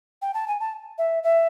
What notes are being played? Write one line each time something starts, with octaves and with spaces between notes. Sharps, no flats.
G5
A5
G#5
A5
E5
E5